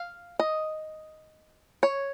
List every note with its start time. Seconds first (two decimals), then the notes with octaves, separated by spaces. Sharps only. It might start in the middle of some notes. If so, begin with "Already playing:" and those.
Already playing: F5
0.40 D#5
1.83 C#5